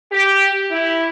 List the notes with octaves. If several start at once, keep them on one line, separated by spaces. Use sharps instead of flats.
G4
E4